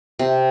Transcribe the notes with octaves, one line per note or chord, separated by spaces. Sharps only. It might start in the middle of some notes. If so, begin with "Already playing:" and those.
C3